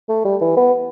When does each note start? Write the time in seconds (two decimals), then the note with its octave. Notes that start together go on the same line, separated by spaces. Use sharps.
0.09 A3
0.25 G3
0.41 E3
0.57 B3